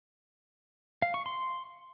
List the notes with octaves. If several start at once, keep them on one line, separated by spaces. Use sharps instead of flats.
F5
C#6
C6